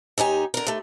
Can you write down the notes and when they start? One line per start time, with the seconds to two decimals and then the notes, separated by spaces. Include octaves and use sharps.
0.18 D#2 D#4 G4 G#5
0.54 D3 A#4
0.67 D#2 A3